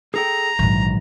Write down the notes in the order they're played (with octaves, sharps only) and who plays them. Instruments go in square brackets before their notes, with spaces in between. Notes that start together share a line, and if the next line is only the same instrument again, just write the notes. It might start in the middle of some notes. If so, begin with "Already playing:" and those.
[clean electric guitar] G#4 A4 G5 [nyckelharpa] A#5
[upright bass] A#1 G#2 [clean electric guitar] D#3 E3 F#3